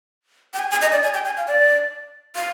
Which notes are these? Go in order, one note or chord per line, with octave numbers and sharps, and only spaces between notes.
G5
G#5
G#5
D#5
D5
G#5
G5
G#5
F5
D5
F5